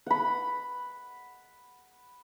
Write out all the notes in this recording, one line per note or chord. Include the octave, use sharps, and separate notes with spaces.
F#5 B5